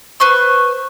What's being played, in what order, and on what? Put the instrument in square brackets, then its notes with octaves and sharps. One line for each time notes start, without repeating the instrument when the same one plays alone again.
[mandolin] B4 C5 C#6 E6